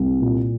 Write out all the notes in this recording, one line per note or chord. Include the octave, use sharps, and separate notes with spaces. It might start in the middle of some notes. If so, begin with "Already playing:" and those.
Already playing: C2
A#2